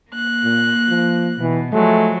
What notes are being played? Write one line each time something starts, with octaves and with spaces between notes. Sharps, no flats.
A#3 F#6
A#2
F3
B2 E3
F3 F#3 G#3 A3